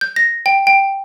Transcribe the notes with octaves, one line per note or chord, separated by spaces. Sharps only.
G6
A#6
G5
G5